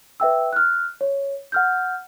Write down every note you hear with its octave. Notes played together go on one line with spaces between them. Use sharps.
B4 E5 G5 E6
F6 F#6
C#5
F#5 F6 G6